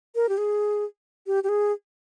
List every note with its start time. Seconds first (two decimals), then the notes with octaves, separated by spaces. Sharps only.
0.15 A#4
0.29 G4
0.38 G#4
1.27 G4
1.43 G4
1.49 G#4